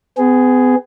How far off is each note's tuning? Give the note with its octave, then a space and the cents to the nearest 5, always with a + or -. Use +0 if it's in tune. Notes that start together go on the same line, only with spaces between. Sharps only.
B3 +40 G#4 +0